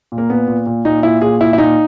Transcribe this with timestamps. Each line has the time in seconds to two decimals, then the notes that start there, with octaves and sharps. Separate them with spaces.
0.12 A#2
0.18 A#3
0.30 A#2 B3
0.48 A#2
0.66 A#2
0.85 A#2 D#4
1.03 A#2 E4
1.22 A#2 G#4
1.41 A#2 E4
1.53 E4
1.58 A#2 D#4